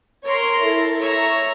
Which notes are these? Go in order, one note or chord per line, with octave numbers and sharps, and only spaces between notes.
A#4 C#5 A#5 C6
E4 A4
C#5 E5 A#5